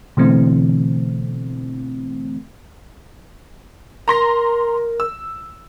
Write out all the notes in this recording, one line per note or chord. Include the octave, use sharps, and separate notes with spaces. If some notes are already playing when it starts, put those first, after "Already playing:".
B2 D3 E3 A3 C4
A#4 A#5 C6 A#6
E6